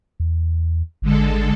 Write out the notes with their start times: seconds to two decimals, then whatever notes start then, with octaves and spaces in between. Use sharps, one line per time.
0.20 E2
1.02 G#1 D3 G#3 A4